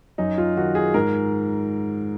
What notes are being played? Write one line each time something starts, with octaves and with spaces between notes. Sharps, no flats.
F#2 D#4
F4
D#3 F#4
G#4
G#2 A#4